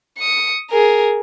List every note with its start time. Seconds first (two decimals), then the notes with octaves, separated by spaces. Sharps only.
0.18 D#6 C#7
0.70 G#4 A#4